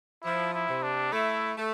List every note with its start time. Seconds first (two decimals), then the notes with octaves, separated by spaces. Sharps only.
0.24 F3 E4
0.54 E4
0.68 C3
0.83 D4
1.12 A3 E4
1.57 A3